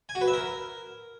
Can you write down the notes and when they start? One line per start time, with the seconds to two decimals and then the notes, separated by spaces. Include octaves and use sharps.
0.09 G#5
0.15 F#4
0.21 B4
0.27 E5
0.33 A#4